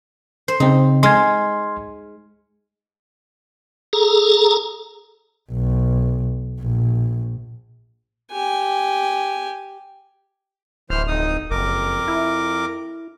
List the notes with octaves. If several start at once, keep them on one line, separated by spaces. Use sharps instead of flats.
C5
C#3 C4 D#4
G#3 C6 F6 G#6
G#4 A4 A#5
B1
A#1
G4 G#5
D1 E3 C5 F6
D1 F2 D#4 D#6
F#1 F2 A#4 D6
E4